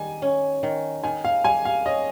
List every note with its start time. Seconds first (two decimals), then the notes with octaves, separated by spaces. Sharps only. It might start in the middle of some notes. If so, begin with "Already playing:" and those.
Already playing: D#3 G3 G#5
0.22 C#4
0.63 D#3
1.04 D#3 G#5
1.25 F5
1.45 G3 G#5
1.65 F5
1.86 C#4 D#5